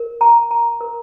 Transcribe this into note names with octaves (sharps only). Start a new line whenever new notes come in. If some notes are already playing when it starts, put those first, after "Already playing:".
Already playing: A#4
A#5
A#5
A#4